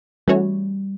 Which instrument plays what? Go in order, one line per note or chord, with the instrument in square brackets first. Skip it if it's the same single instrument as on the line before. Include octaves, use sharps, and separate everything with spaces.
[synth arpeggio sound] E3 A3 C#4 F#4 C#5 [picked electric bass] G3